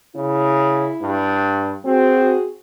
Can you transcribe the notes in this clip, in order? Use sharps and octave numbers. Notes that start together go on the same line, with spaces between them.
C#3 E4
G2
C4 F#4 G#4